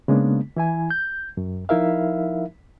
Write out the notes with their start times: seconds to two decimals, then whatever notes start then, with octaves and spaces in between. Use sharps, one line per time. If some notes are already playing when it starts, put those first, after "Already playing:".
0.08 C#3 G#3 A#3 B3 D4
0.57 E3 E4 G#5
0.91 G6
1.37 F#2
1.69 F3 D#4 E4 A#4 E5 F5